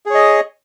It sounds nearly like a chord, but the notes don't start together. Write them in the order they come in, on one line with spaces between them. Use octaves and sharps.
G#4 C#5 D#5